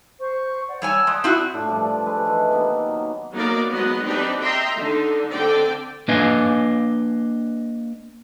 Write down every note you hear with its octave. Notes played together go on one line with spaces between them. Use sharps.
C5 C#6
D5 F#5
G3 C#5 F#5 G#5 A5 E6
G#3 D5 A5 D#6
C4 E4 F#4
A2 D4 F4
G2 F3 G3 D5
G#3 A3 A4 B4
E3 E4
C3 D#3 A#3 B3
F#3
F#3 A#3 B3 D#4 A#4 D5
F#3 G#3 B3 B4 D#5
C4 D4 D#4 G4 B4 D5
D#5 E5 G5 A#5 C6
D3 D4 D#4
D3 C4 D5 G5
A#3 D4 B4 D#5 F5 G#5